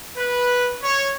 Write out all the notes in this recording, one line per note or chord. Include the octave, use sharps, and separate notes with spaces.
B4
C#5